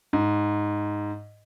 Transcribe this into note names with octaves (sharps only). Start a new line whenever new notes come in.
G#2